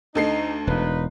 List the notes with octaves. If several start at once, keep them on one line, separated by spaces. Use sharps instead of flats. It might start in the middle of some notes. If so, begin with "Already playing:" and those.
D2 D#4 A4 C7
E1 D#4 F4 B4